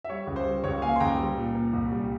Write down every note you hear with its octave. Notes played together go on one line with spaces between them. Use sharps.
E5
G3 C#5
C#2
C5
G3
C#2 C#5
A#3 F5 G#5
C6
C#2 G5 A#5
G3
A#2
A#3
C2
G3